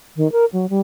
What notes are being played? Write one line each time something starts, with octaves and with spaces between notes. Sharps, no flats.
D#3
A#4
F#3
G3